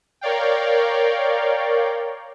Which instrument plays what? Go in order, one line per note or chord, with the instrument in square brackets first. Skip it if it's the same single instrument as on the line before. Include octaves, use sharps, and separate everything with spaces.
[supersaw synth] A#4 C#5 D5 F5 G5